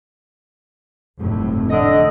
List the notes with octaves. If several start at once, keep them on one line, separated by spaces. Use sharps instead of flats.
F1 F2 A2
D3 F3 D#5